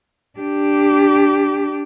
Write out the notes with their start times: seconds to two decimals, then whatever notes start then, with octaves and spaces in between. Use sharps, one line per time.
0.39 D4 G4